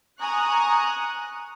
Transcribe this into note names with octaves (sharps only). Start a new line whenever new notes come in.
G#5 A#5 C#6 D#6 F#6